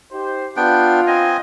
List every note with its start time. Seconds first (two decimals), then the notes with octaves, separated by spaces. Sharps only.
0.12 D#4 G4 C5
0.57 B3 D4 F4 G5
1.07 C4 D#5 G#5